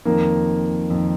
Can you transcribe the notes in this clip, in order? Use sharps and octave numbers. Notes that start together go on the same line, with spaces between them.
F2 D#3 A#3
F2 D#3